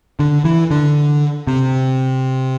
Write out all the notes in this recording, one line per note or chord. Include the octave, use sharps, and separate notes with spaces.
D3
E3
D3
C3